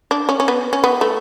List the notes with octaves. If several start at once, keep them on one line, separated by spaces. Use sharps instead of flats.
D4
C#4
C#4
B3
C#4
B3
A3